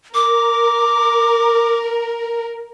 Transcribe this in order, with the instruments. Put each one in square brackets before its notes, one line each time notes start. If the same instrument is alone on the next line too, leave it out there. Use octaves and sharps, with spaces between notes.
[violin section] A#4 [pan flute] D6